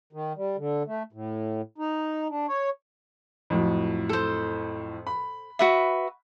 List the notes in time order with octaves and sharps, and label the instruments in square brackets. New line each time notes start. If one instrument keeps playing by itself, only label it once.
[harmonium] D#3
G3
D3
A3
A2
D#4
D4
C#5
[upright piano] F2 A2 F#3
[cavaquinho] A4 C5
[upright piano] B5
[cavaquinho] F#4 B4 E5